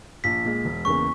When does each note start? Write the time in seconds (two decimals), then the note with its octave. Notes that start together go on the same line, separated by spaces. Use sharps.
0.24 A#1 B6
0.45 A#2 G#3
0.65 E1
0.85 E2 C#3 E3 A#3 C#6